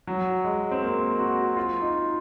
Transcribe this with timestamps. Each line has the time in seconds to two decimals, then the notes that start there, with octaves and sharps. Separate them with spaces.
0.07 F#3
0.44 G#3
0.71 C4
0.82 A#3
1.19 F#4
1.57 F4
1.81 D#4